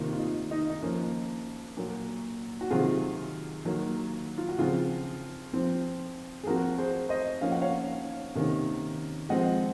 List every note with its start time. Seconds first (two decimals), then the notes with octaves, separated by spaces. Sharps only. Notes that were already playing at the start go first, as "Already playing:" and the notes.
Already playing: C3 D#3 A#3 F4
0.13 F4
0.19 D#4
0.51 D#4
0.70 D#4
0.82 F3 A#3 C#4
1.77 A#2 F#3 A#3
2.61 F#4
2.70 C3 D#3 F#3 C4 F4 G#4
3.65 D#3 F#3 A#3
4.38 F4
4.49 F#4
4.58 C#3 F3 C4 F4 G#4
5.53 F3 C4
6.44 G#4
6.46 F3 C4 F#4 A#4
6.78 G#4 C5
7.09 C5 D#5
7.41 F3 A#3 C#4 F5
7.52 F#5
7.62 C#5 F5
8.35 C3 D#3 A#3 C#4
9.29 F3 G#3 C4 D#5 F#5